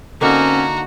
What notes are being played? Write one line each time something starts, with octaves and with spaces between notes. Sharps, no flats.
D3 A#3 C4 C#4 D#4 F#4 A#5